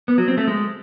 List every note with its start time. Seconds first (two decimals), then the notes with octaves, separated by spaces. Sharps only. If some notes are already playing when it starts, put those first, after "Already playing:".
0.08 B3
0.18 F#3
0.28 C4
0.38 A3
0.47 G#3